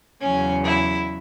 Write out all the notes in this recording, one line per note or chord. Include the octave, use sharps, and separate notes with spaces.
E2 C#3 F#3 C#4
E4